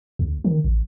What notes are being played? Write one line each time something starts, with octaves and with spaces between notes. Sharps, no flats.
D2
D#3
A1